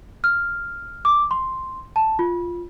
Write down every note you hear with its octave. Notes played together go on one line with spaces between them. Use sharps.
F6
D6
C6
A5
F4